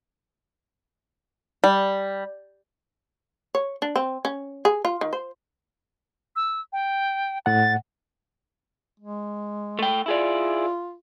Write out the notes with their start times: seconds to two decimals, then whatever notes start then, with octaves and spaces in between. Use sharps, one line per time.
1.64 G3
3.55 C#5
3.82 D4
3.96 C4
4.25 C#4
4.65 G#4
4.85 F4
5.01 D#3
5.13 C5
6.36 E6
6.73 G5
7.46 A2 F#5 A6
8.99 G#3
9.79 A3 G5
10.06 E4 F4 G#4 D5